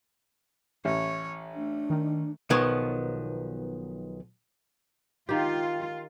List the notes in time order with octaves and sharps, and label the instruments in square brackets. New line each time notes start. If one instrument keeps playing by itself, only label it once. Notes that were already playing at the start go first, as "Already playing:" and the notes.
[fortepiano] A1 [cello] C#5
[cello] A3 [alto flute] D4
[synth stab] D#3
[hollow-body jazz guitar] B1 D#3 F3 B3 C#5
[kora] D#3 G4 [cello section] F4